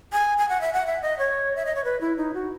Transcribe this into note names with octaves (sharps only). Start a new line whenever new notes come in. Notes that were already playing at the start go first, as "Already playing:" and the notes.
G#5
G#5
F#5
E5
F#5
E5
D#5
C#5
E5
D#5
C#5
B4
E4
D#4
F#4